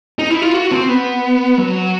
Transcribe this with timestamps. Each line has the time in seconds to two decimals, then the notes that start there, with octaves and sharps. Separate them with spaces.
0.19 D#4
0.30 E4
0.42 F4
0.54 F#4
0.71 C4
0.89 B3
1.58 F#3